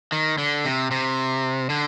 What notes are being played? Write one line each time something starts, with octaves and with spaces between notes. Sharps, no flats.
D#3
D3
C3
C3
D3